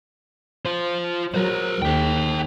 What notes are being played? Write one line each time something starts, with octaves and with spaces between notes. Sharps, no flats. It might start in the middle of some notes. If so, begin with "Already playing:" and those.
F4 C5
F#3 A#4 C5
D#2 G#4 G5